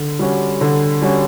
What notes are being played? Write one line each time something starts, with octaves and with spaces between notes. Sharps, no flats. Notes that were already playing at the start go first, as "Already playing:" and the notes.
Already playing: D3
G3 C#4 F#4
D3
G3 C#4 F#4